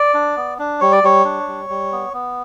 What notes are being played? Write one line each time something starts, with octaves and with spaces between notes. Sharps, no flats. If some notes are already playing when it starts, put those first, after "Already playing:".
Already playing: D5
D4
B3
D4
G3 C#5
D5
G3 C#5
D4
G3
G3
B3
B3